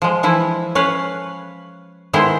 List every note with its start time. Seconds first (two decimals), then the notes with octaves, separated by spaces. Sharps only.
0.02 F3 G#3
0.23 E3 F3 E4
0.75 C#4 B4 C#5 F5
2.13 D#3 G#3 B3 E4 C5 G5